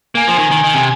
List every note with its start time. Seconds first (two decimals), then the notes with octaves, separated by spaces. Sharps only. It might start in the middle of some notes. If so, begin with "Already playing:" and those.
0.15 A#3 G#5
0.28 F3
0.39 D#3
0.51 D#3
0.64 D#3
0.75 C3